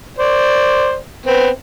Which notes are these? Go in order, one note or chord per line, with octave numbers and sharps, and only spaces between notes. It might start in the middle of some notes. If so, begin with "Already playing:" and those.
C5 D5
B3 C4